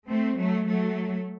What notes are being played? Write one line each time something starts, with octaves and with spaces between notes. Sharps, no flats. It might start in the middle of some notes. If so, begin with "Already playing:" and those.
A3 C4
F#3 A3
F#3 A3